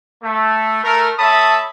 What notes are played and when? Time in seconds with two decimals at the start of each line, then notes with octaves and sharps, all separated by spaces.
0.23 A3
0.84 A3 A#4
1.18 A3 C#5 E5 A5 B5 D#6